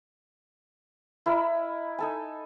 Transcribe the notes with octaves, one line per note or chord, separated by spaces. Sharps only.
E4 A#4 D#5 B5
D#4 A4 G#5